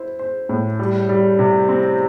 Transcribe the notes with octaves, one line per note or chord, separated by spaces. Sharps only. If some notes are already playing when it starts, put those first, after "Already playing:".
Already playing: E4 C5
C5
A2
G3
G3
C3
C4